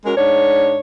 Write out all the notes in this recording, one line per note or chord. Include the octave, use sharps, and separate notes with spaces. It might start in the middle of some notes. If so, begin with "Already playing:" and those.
G#3 C#4 F#4 A#4
G#2 D4 C#5